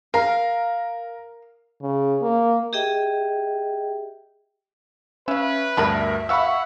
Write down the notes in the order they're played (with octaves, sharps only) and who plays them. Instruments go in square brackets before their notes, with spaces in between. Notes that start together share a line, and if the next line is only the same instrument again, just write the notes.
[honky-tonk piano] A#4 [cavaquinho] F5
[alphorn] C#3
A#3
[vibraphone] G4 G#4 D#5 E5 G5
[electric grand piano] C#4 [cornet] B4 [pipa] E5 F5
[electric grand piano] D2 G2 A#4 [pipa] B3 A5 B5 [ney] E5
[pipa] B2 F5 [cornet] F#5 [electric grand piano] B5 C#6 E6